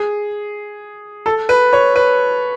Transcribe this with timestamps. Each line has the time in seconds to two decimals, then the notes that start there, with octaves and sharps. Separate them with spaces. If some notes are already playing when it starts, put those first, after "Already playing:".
Already playing: G#4
1.26 A4
1.49 B4
1.73 C#5
1.96 B4